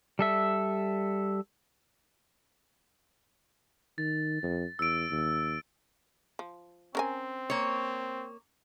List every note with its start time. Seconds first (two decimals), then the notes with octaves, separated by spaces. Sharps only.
0.19 G3 A4 E5
3.98 D#3 A6
4.43 F2
4.79 E2 E6 D7
5.11 D#2
6.39 F3
6.95 C4 C#4 A#4 G#5
7.50 A#3 C#5